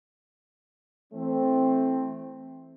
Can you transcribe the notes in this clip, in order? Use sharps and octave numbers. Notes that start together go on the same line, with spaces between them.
E3 A3 C4